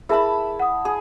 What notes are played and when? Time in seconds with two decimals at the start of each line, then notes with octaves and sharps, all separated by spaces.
0.09 E4 G#4 A#4 E5 A5 B5
0.60 F#5 D#6
0.85 G#4